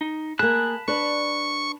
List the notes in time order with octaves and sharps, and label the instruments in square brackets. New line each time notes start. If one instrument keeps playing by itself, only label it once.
[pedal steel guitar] D#4
[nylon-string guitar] A#3 G#4 [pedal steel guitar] A5 B5 F#6
[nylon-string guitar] D4 B4 [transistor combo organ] C#6